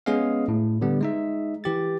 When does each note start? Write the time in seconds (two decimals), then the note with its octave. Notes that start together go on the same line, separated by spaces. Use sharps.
0.06 G#3 B3 C#4 G#4 D#5 F5
0.48 A2
0.81 D3 G3 B3
1.01 G#3 D#4 E5
1.64 E3 G4 A6